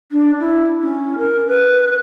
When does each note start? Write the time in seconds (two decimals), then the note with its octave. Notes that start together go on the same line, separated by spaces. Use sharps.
0.12 D4
0.40 E4
0.81 C#4
1.18 A#4
1.47 B4